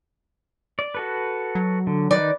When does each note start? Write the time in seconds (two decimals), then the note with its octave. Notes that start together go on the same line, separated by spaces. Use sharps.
0.79 D5
0.95 F#4 A4 B4
1.55 F#3
1.87 D3
2.11 D#3 D#4 B4 D5